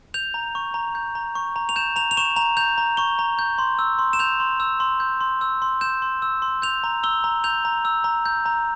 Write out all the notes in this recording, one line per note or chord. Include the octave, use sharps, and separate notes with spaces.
G6 F7
A#5
C#6
A#5
G6
A#5
C#6
A#5
F7
G6 E7
A#5 F7
F7
C#6 E7
A#5 F7
G6 F7
A#5
C#6 G7
A#5
G6
C6
E6
C6
E7
G6 F7
C6
E6
C6
G6
C6
E6
C6
G6 E7
C6
E6
C6
G6 F7
A#5
E6 G7
A#5
G6 F7
A#5
E6
A#5
G6
A#5